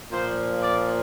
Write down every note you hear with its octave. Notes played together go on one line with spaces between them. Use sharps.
A#2 F3 C5
D5